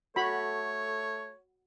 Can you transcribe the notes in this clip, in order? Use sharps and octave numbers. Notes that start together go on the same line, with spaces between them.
A3 F#4 A4 C#5 B5